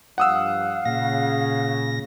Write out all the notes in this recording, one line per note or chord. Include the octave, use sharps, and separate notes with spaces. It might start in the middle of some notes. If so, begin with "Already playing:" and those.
G2 F3 F5 F#5 D#6 E6
A#2 C#3 A#6